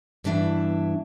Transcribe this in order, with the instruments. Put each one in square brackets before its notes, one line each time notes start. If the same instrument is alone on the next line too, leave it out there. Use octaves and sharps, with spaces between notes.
[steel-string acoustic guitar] G2 B2 E3 D4 E5